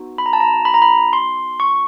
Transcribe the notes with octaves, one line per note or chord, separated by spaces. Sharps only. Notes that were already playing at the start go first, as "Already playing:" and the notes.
Already playing: B3 D#4 F#4
B5
A#5
A5
A#5
B5
A#5
B5
C6
C#6